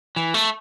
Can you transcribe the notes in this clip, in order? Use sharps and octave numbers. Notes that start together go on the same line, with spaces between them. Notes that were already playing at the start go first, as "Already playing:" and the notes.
E3
A3